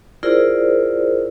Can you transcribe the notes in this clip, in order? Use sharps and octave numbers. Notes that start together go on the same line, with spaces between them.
E4 F4 G#4 A#4 C5 D5